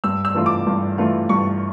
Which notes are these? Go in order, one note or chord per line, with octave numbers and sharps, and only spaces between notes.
G2 E6
E6
E3 A3 D4 F4
D6
G2
E3 A3 D4 F4
G2 C#6